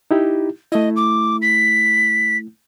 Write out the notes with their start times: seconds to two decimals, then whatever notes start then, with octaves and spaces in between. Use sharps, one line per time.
0.11 D#4 E4 G4
0.72 A3 E4 D#5
0.96 D6
1.42 B6